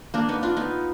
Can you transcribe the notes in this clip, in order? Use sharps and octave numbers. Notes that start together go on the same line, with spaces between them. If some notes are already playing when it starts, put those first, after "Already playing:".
A#3 D4
B3 D#4
D4 F4
B3 D#4